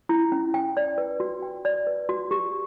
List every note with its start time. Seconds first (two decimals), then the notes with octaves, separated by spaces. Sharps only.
0.09 E4
0.32 C#4
0.54 G5
0.77 D5
0.98 B4
1.20 F#4
1.42 G5
1.65 D5
1.87 B4
2.09 F#4
2.31 G4